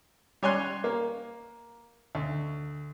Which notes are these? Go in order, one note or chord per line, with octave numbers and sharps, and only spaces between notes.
G3 C#5 G#5 C6 F#6
A#3
D2